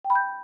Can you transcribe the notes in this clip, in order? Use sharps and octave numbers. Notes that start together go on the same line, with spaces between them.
G5
B5
G6